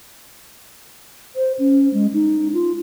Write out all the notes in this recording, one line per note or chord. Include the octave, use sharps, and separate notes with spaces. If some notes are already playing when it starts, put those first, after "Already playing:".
C5
C#4
G#3
D#4
F4